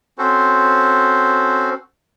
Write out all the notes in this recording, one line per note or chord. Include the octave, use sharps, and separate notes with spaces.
C4 C#4 F#4 A4 C5